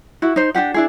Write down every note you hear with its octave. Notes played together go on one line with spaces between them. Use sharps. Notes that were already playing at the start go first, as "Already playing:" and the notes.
E4 F#4
D#4 C5
D4 F#4 G4 F#5
D4 E4 G#4